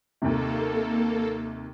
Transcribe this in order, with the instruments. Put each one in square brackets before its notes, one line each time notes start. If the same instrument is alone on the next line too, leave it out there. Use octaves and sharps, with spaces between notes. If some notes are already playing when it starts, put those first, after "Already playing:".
[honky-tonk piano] D#2 C3 [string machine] A#3 A4